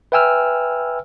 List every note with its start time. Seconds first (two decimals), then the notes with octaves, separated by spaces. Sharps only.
0.12 B4 E5 G5 G#5 E6 F6